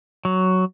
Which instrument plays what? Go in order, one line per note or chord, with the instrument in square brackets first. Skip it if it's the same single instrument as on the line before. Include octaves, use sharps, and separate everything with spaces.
[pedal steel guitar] F#3